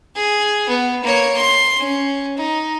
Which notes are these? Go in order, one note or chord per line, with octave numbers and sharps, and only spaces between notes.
G#4
B3
A#3 C#5
C6
C#4
D#4